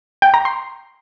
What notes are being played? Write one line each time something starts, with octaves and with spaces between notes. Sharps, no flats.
G5
A#5
C6